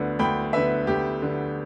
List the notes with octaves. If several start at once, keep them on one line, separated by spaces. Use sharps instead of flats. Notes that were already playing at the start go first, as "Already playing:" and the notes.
Already playing: D2 D3 B3
D2 G5 B5
D3 B3 B4 E5
D2 G4
D3 B3